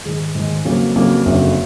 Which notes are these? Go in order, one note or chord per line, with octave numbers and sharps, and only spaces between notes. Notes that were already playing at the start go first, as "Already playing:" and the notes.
G#2 D#3 G#3
G#2 D#3 G#3
F2 C#3 F#3 A#3
F2 C#3 F#3 A#3
F#1 F2 D3 F#3